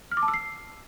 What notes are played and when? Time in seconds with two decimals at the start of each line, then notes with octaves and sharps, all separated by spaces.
0.11 F6
0.17 D6
0.23 A5
0.28 E6
0.34 C7